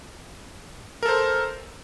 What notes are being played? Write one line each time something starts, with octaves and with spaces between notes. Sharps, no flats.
A4 A#4 C5